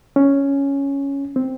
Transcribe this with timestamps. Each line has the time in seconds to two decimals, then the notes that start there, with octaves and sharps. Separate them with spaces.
0.16 C#4
1.36 C4